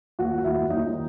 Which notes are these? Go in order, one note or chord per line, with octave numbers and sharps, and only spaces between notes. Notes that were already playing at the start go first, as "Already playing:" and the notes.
D#2 F#4 F#5
D#2 E4 E5
D#2 D#4 D#5